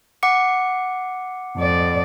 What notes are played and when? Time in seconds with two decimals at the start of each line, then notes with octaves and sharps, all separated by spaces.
0.23 F#5 D6 C#7
1.57 F2 D5